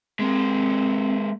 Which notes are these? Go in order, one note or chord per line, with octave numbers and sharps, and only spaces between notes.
G#3 A#3 C4